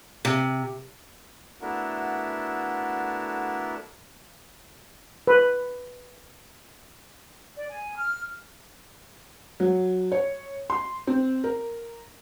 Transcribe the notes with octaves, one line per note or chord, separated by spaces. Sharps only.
C3
A3 B3 D4 E4 F#4 A#4
B4
D5
G#5
F6
F#3
C#5
C6
C4
A#4